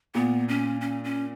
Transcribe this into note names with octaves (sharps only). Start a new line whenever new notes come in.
A#2 B3
C#4
C#4
C#4